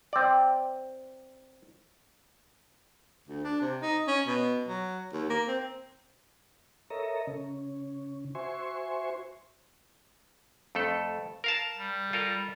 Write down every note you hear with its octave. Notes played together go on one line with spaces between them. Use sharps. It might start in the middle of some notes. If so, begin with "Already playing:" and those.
C4 D5
D2
D4
C3
D#4
C#4
B2
F#3
D#2
A#3
C4
A4 A#4 C#5 D#5 E5 A#5
C#3 C#4
F#4 C5 E5 G#5 C6 C#6
F2 A3 A4
A#4 F5 A5
G3
F4 A4 A#4